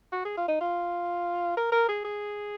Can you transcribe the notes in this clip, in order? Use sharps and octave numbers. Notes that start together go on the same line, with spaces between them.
F#4
G#4
F4
D#4
F4
A#4
A#4
G#4
G#4